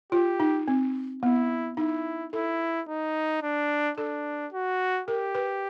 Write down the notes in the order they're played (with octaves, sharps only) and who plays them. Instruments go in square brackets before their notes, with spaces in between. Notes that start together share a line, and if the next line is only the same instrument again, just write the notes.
[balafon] F4 [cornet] G4
[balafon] D#4
C4
[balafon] B3 [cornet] E4
[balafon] D#4 [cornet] E4
[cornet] E4 [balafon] A4
[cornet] D#4
D4
[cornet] D4 [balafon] A4
[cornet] F#4
[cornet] G4 [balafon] A#4
[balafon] B4